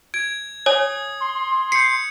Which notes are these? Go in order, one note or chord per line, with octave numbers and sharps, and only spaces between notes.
G#6 D7
C#5 G#5 D#6
C6
G6 C7 C#7